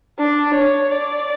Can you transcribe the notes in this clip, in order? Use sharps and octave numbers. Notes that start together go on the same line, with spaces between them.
D4
C#5
D5